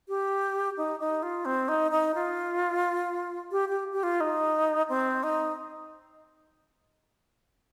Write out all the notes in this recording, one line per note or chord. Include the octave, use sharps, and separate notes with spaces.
G4
D#4
D#4
F4
C4
D#4
D#4
F4
G4
G4
G4
F4
D#4
C4
D#4